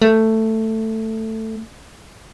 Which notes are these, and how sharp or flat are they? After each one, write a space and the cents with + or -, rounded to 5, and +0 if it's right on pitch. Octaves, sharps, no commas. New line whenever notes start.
A3 +10